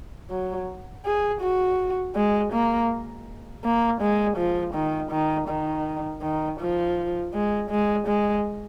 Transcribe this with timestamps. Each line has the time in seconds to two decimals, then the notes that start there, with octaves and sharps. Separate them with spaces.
0.30 F#3
1.05 G#4
1.41 F#4
2.15 G#3
2.53 A#3
3.64 A#3
4.01 G#3
4.37 F3
4.74 D#3
5.11 D#3
5.49 D#3
6.22 D#3
6.60 F3
7.34 G#3
7.70 G#3
8.07 G#3